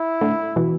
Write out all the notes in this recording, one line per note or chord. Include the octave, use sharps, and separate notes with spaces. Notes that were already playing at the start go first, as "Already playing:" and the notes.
Already playing: E4
A2 D3
B2 E3